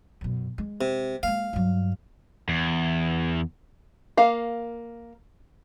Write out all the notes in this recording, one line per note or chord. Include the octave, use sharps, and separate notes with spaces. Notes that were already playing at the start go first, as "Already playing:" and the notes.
F#2 B2
G#3
C3
G#3 A#3 F5
G2 F#3
E2
A#3 F5